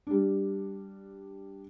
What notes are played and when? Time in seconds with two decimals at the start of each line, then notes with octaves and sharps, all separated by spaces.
0.07 G3 D4